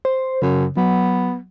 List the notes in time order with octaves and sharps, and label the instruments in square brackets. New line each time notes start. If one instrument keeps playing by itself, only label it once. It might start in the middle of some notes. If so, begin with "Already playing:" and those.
[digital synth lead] C5
[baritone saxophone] F#2 [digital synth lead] C#3
[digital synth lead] F#3 [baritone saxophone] B3